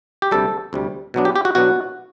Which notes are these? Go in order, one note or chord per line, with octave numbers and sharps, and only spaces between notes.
G4
D2 C3 G3 A4
D2 C3 G3
B2 F#3 B3 D4
G4
G4
F#4
B2 F#3 B3 D4 F#4